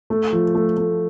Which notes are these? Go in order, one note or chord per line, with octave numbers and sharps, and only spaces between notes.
A3
F3
A3
A3